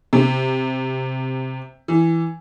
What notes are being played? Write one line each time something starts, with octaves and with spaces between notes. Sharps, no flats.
C3
E3